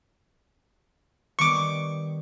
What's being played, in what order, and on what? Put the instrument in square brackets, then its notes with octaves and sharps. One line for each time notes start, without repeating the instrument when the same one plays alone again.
[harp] D#3 G3 B3 [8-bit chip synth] C#6 D6